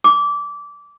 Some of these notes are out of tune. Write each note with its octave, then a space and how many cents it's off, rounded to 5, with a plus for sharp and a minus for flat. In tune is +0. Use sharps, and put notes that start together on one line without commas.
D6 -20